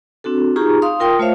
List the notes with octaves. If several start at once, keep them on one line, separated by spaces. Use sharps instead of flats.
C4 D4 F#4 A4
D#4 F4 G4 G#4 A#5 C#6
F5 C6 D#6
F4 A#4 G5 C6 D#6
A3 F4 C5 C#5 E5 F5